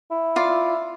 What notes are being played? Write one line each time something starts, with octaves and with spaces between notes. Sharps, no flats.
E4
F4 D5